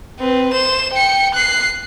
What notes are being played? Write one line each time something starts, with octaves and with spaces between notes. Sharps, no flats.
C4 B4
C5 E7
G5 C#7
F#6 C7